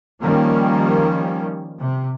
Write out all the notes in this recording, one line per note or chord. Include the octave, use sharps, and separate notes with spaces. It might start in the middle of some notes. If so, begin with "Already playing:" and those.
D#3 F3 G3 A#3 C#4
C3